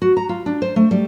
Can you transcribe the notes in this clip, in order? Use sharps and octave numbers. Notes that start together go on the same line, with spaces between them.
F#4
A#5
F4
D4
C5
A3
G3